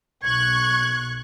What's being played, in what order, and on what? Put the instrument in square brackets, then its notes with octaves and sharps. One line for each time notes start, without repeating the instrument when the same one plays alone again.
[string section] B1 C#6 F#6 [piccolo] G#6